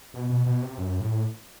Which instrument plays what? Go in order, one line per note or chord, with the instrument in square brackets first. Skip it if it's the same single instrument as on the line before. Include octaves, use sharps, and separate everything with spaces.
[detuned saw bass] B2
B2
B2
C3
F#2
A2